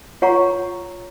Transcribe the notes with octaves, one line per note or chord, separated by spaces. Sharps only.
F4 C#5 F#5 A#5 C#6